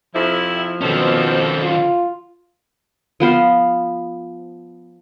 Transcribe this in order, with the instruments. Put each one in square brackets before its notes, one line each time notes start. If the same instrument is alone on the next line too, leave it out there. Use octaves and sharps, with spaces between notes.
[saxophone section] F2 C3 E4 [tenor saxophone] F3
[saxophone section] F2 A4 C5 [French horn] B2 [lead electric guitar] D#3 C#4
[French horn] F4
[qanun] F3 B3 C5 F5